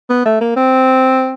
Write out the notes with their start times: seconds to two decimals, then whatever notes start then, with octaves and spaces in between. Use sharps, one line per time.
0.10 B3
0.25 A3
0.41 A#3
0.56 C4